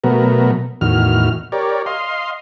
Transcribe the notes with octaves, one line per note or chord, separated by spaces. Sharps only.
B2 F#3 A3 B3 A#4
E2 A2 D#3 F#4 F6
G4 A#4 C#5 D5
D#5 F5 C6